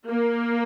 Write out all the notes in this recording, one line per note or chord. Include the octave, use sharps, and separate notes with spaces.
A#3